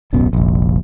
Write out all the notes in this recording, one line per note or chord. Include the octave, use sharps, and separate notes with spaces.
D1 B1 F#2 B3
F1 A#1